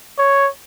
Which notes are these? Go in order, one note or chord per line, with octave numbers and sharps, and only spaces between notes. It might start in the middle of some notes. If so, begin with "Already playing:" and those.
C#5